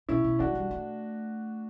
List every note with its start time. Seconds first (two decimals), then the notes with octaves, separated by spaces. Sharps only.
0.09 B2 C#4 E4
0.24 B2
0.39 F#3 D4 F#4
0.55 G3
0.71 A3